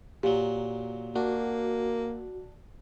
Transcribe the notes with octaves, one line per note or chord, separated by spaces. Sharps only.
A#2 F#3 G4
A#3 D4 F#4